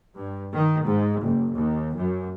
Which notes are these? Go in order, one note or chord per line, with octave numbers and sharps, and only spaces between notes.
G2
D#3
G#2
F#1
D#2
F#2